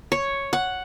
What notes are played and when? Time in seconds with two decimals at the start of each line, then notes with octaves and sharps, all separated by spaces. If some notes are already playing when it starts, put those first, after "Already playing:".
0.12 C#5
0.53 F#5